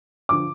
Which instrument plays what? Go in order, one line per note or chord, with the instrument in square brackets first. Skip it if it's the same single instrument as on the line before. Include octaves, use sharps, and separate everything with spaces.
[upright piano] D3 F3 D6